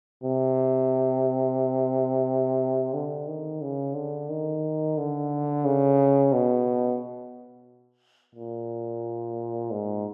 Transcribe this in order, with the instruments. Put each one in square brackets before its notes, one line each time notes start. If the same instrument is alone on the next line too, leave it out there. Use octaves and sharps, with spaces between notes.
[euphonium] C3
D3
D#3
C#3
D3
D#3
D3
C#3
B2
A#2
G#2